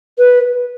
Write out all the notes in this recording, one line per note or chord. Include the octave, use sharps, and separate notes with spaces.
B4